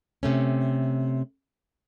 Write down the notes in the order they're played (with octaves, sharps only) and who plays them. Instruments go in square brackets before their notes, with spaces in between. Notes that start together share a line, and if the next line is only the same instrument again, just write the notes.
[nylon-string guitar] C3 A3 C#4